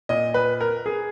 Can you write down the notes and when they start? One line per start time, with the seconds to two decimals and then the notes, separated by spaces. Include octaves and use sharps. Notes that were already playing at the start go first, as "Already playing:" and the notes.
0.09 A#2 D#5
0.34 B4
0.61 A#4
0.86 G#4